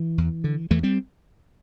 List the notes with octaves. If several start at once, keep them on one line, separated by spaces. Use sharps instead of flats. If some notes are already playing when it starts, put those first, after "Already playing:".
Already playing: E3
E2
D3
E2 E3 A3
G3 C4